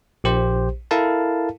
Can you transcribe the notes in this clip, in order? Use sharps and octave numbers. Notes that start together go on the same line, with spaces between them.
A#1 G4 C5
E4 A4 A#4 F5 A5